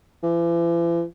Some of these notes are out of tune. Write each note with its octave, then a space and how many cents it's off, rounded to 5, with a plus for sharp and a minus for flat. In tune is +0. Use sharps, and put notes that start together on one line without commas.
E3 +45